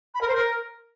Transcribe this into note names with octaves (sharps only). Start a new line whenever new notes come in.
B5
A#4
C5
A#4